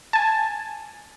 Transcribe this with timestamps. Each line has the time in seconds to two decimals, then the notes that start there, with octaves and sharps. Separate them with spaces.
0.13 G#5 A5